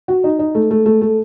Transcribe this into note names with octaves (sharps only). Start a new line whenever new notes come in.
F#4
D#4
D#4
A3
A3
A3
A3